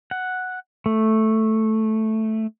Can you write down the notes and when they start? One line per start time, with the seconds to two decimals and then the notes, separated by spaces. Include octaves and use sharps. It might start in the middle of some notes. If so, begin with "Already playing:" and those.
0.11 F#5
0.86 A3